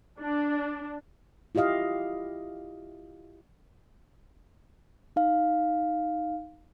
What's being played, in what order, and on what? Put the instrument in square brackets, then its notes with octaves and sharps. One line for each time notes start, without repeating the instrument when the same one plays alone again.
[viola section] D4
[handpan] E4 F4 G4 D#5 F5
[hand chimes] D#4 F5